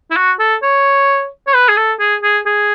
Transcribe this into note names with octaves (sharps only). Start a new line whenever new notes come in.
E4
F#4
A4
C#5
C#5
B4
G#4
A4
G#4
G#4
G#4